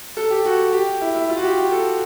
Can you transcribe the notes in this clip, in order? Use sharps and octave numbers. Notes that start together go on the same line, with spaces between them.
A4
G4
F#4
G4
E4
E4
F4
F#4
G4
G4
A4